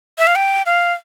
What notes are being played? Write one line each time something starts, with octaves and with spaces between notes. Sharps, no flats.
E5
F5
G5
F5